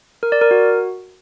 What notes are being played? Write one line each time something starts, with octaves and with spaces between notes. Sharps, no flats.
A#4
D5
A#4
F#4